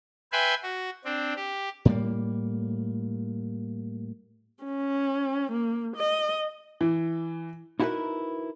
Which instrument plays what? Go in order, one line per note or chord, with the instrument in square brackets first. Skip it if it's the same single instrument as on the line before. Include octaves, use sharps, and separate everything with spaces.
[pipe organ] B4 E5 G5 G#5 B5 C6
F#4
C4 D4
G4
[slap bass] A2 G3 A#3
[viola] C#4
A#3
D#5
[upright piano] E3
[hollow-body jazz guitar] D#4 E4 F#4 G4 A#4 B4